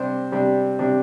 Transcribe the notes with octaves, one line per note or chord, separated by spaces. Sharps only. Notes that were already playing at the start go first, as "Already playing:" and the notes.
Already playing: C3 G3 D4 C5
C3 G3 D4
C3 G3 D4